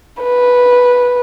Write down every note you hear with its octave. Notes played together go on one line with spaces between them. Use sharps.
B4